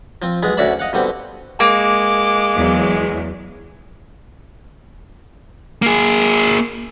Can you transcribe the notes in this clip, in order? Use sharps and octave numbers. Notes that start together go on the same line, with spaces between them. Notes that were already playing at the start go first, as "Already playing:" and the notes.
F3 C4
B1 G#3 B3
D2 C#4 F#4 D5 E5 B5
D#5 F5 F#5
B2 D3 G3 C4
G#3 A#3 D6
E2 F#3
A#3 G#4